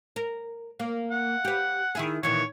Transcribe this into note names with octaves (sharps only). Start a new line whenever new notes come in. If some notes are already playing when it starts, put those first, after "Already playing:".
A#4
A#3
F#5
G4 B4
D#3 E4 G#4
A#2 D#3 E3 C#5